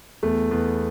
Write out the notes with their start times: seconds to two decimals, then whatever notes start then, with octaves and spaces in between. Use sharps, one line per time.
0.23 E2 A3
0.51 E2 B3